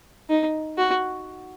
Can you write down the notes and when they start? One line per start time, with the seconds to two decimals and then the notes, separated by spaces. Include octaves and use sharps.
0.30 D#4
0.78 F#4